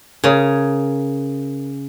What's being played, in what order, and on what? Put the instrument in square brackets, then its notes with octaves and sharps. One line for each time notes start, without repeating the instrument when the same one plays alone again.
[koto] C#3 [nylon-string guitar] G#4 A#4 C#5